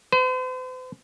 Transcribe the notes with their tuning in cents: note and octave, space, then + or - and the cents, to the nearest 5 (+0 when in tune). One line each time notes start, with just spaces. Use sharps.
C5 -45